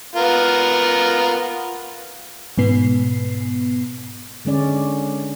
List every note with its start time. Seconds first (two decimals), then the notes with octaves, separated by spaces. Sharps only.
0.15 B3 F4 A#4
2.58 G#2 B2 B3 C7
4.45 D3 G#3 C#4 D5